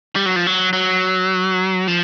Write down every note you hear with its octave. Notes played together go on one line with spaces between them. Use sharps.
G3
F#3
F3
F#3
F#3
F3